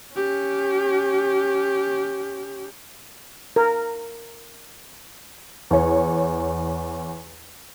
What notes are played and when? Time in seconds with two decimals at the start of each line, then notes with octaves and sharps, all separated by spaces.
0.14 C#4 G4
3.56 A#4
5.71 E2 C#5